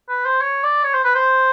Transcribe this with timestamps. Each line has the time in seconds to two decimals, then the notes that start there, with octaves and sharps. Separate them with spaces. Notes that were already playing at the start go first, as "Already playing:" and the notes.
0.09 B4
0.25 C5
0.41 C#5
0.63 D5
0.83 C#5
0.94 C5
1.04 B4
1.15 C5